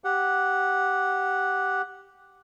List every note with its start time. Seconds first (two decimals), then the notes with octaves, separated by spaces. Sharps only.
0.04 G4 F#5